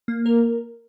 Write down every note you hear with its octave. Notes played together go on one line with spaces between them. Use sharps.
A#3
A#4